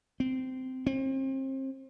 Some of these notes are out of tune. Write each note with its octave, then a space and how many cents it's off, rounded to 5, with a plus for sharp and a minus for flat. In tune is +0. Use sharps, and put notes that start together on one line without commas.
C4 -15
C4 +35